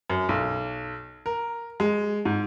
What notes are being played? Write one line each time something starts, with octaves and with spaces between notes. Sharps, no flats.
F#2
B1
A#4
G#3
G#2